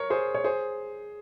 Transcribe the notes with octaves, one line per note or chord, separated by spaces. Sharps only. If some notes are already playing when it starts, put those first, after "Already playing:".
Already playing: A#4 C#5
G#4 C5
C#5
G#4 C5